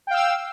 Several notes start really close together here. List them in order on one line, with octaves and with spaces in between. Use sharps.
G5 F5 E6